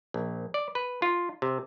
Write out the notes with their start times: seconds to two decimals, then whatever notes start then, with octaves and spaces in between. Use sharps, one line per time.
0.14 A#1
0.54 D5
0.75 B4
1.02 F4
1.42 C3